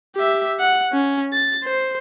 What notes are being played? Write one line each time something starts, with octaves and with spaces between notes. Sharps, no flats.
G4 E5
F#5
C#4
A6
C5